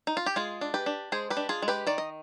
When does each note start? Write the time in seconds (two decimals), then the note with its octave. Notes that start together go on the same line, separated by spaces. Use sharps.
0.07 D#4
0.17 F4
0.26 G4
0.36 G#3 F4 G#4
0.61 D4
0.74 G4 B4
0.86 D4
1.12 G#3 G#4 C5
1.30 G4 B4
1.37 D4
1.49 F4 G#4
1.62 G#3
1.68 G4 B4
1.87 D#3 D5
1.98 D#5